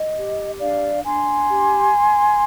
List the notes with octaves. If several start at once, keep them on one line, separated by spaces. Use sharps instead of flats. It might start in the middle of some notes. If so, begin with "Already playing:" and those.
Already playing: D#5
G4
D4 D5 F5
D4 G#5 C6
G4